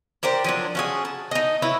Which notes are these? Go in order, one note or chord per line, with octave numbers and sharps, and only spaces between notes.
D4 G4 A#4 C5
F3 F#3 D4
C#4 F#4 G#4
A5
D#4 D#5
E4 F#4 B4 C#5